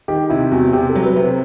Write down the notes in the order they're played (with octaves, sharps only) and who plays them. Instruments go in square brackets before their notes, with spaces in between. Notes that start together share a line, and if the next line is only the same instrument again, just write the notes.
[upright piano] D#3 [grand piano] G4
[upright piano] C3 [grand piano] E4
[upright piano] E2 [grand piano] F#4
[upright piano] C3 [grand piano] G4
[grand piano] A4
[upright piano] F#3
[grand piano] B4
[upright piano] C3
[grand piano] C5